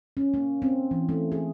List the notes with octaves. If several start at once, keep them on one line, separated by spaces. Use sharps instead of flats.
C#4
A#3
C4
E3
A3
G#4